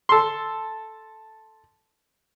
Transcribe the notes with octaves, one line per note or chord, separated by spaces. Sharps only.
A4 C6